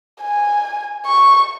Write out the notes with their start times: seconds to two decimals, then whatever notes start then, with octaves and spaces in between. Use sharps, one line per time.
0.22 G#5
1.06 C#6